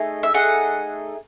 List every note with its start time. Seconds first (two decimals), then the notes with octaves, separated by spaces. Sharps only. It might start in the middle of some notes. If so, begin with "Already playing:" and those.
Already playing: A3 D#4 G#4
0.23 E5
0.34 A3 D#4 G#4 F#5